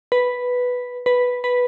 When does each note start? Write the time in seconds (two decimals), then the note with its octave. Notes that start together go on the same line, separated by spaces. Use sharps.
0.12 B4
1.06 B4
1.44 B4